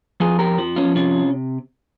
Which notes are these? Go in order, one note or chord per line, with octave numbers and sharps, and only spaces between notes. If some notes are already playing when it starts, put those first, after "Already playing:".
F2 F4 G#4
G4 A#4
F3
C#4 F4
C3 C#4 F4